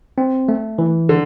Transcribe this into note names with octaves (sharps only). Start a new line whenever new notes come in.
C4
A3
E3
D3